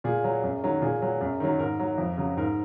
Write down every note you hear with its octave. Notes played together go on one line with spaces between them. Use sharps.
A#2 G#4
F#3
F#2
D#3 F#3
A#2 G#4
F#3
F#2
D#3 F#3
G#2 A#4
F#3
F2
C#3 F#3
G#2 A#4